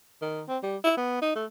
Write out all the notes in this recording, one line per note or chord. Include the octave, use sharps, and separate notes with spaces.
D#3
C4
G3
E4
B3
D#4
A3